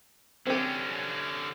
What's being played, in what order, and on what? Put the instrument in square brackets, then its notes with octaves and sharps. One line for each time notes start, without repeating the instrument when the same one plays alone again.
[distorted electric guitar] D3 C#4 [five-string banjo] C4 G4